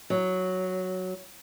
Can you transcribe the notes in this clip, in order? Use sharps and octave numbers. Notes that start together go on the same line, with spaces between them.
F#3